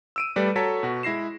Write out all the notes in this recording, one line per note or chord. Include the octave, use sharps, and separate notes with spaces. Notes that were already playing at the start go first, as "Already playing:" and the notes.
E6 D7 D#7
G3 A3 B4 D5
F#4 A4 C#5 A5 A#5 B6
B2 F#4
G#3 E4 A#6 C7 E7